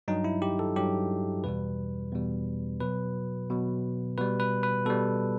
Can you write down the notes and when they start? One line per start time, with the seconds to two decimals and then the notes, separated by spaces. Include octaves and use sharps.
0.08 G2 F#3 D#4
0.24 E4
0.42 G4
0.59 A4
0.76 G2 F#3 G4
1.44 E2 B2 G3 B4
2.12 E2 B2 G3
2.80 B2 F#3 B4
3.50 B2 F#3
4.18 B2 G3 B4
4.40 B4
4.63 B4
4.86 B2 G3 A4